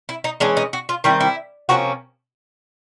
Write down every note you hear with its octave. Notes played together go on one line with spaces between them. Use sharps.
E4
D#4
E3 G#3 C#4 D4
D#4
F#4
F4
D#3 G3 C4 E4
E4
C3 F3 A#3 C#4 F#4